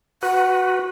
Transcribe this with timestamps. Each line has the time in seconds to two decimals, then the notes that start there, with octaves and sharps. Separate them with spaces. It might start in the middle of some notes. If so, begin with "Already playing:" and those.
0.23 F#4 B4 F#5